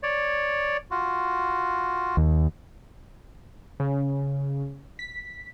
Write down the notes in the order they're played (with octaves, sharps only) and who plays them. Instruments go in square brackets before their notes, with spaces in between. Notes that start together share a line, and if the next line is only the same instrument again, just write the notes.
[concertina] C#5 D5
F4 F#4
[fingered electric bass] D#2
[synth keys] C#3
B6